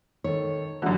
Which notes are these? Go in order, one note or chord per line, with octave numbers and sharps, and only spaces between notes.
D#3 A4 C#5
F#2 D3 E3 F#3 G3